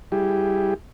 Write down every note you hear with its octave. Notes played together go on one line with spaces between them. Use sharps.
G3 E4 G4 G#4